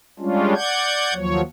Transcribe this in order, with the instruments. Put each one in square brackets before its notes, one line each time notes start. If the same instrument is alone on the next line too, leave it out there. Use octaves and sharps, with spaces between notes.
[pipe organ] G3 G#3 C#4 D4 F4
D5 F#5 G6 G#6
D#2 F3 F#3 C#5